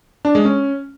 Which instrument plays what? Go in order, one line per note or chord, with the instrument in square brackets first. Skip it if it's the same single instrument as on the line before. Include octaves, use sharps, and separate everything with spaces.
[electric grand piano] D4
G#3
C#4